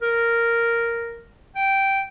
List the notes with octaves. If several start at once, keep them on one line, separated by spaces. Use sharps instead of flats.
A#4
G5